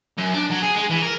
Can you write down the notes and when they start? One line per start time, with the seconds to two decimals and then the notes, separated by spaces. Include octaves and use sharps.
0.18 F#2
0.34 D4
0.51 F#3
0.63 G#4
0.76 G#3
0.90 E3
1.02 A#4